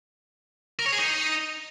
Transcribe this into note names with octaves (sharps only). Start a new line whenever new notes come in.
A#4
C#5
G#4
D#4